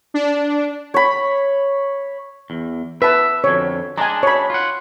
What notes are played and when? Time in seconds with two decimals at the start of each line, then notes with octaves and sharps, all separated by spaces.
0.14 D4
0.94 C#5 B5
2.50 E2
3.02 B4 E5 A5
3.44 F2 D3 C#5
3.98 G#3 D4 G#5 A#5
4.23 C#5 B5
4.50 F4 F#5